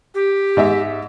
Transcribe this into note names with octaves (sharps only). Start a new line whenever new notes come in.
G4
G#2 D#5 E5